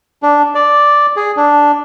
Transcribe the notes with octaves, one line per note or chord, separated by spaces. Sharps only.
D4
D5
G#4
D4